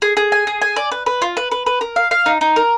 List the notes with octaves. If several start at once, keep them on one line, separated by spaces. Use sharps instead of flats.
G#4
G#4
G#5
G#4
G#5
D5
B4
B4
F4
B4
B4
B4
A#4
F5
F5
D#4
D#4
A#4